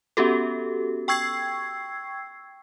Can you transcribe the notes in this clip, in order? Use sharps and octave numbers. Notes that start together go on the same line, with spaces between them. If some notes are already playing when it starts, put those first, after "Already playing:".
B3 C#4 F#4 G4 A4
G5 C#6 E6 G#6 C7